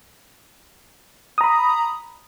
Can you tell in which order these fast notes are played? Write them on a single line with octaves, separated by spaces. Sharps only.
D#6 A#5 B5